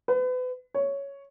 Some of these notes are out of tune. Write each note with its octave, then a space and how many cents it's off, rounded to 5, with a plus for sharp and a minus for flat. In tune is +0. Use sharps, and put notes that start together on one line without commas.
B4 +35
C#5 +5